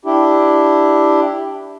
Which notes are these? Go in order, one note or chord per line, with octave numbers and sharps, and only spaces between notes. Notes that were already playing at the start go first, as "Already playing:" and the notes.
D4 E4 G4